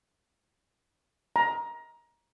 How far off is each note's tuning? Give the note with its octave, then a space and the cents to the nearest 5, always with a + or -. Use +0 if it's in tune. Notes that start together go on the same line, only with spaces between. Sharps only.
A#5 +20